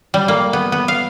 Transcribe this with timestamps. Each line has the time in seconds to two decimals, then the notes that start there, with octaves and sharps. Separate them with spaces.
0.14 G3
0.28 A#3
0.53 B3
0.72 B3
0.88 F5